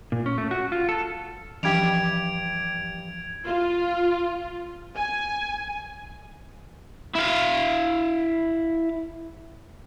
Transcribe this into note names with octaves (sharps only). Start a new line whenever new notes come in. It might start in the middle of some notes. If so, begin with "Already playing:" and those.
A#2
C#4
A3
F#4
F4
A4
G2 E3 F3 G4 G#6 D7 F7
F4
G#5
E4 F5